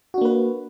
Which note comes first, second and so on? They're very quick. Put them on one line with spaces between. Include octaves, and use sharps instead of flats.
F#4 D4 A#3 B4